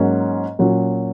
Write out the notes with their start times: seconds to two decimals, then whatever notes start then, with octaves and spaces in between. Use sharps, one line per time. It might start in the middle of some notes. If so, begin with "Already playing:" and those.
Already playing: G#2 F#3 A#3 C#4
0.59 A#2 F#3 C#4